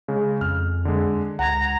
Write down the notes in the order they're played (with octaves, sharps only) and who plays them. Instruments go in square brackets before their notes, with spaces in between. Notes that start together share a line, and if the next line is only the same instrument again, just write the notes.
[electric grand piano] C#3 G#3
[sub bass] F2 [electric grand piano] F6
[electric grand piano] D3 G#3
[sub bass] C#2 [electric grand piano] F#5 G#6 [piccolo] A#5